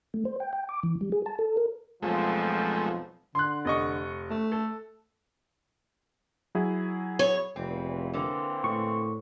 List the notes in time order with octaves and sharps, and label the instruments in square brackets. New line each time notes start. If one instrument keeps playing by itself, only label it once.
[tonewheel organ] A3
C5
G5
G5
D6
E3
G3
G#4
A5
A4
A#4
[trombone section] B1 F2 F3 [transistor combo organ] G#3 A3
[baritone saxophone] D3 [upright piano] C6 F#6
[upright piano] F1 D#5 C#6
[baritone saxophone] A3
[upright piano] A4
[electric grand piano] F#3 E4 G#4
[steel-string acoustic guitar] C#5
[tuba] F1 [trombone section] E2 A#2 E3 [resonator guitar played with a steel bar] C4
[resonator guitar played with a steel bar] D3 A#3 [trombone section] E3 C4
[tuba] A2 [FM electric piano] C#6